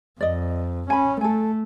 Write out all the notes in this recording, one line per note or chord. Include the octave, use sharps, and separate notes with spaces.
F2 D5 D#5
C#4 G#5 B5
A3 A4 G#5